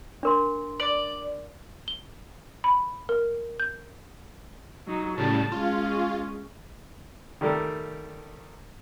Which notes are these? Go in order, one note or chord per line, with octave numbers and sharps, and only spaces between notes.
D4 A#4 C6
D5
G7
B5
A#4
G6
F#3 D#4
A2 C#3 G3 A5
G#3 C#4 F4
D#3 G3 A3 G4 A4 A#4